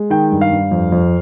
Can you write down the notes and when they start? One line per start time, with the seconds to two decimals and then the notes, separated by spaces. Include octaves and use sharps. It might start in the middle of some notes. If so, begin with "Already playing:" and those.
Already playing: G#3
0.10 D#3 G5
0.31 G2
0.41 F5
0.51 G2
0.71 F2
0.92 F2